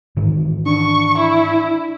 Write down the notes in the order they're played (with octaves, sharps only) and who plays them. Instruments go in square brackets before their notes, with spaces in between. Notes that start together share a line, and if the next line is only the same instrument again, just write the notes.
[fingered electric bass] G#2 D#3 E3
[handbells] D4 [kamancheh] C#6
[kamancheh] E4